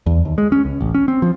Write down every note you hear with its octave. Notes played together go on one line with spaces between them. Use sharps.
E2
D#2
G#3
C#4
C#2
A1
C#4
C4
F3